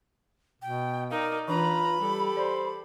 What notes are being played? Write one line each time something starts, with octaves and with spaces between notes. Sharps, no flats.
B2 G5
D#4 A#4 D5 F5
E3 D4 F4 B4 A#5 B5
G3 G4 A4
C5 D5